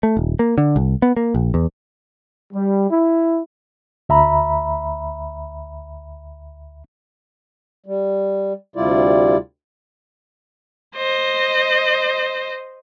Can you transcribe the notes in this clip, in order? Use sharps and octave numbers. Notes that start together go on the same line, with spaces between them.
A3
D#1
A#3
D3
C2
B3
A#3
A#1
E2
G3
E4
D2 E5 A#5 B5
G3
D2 C3 G3 E4 F4 D5
C5 D#5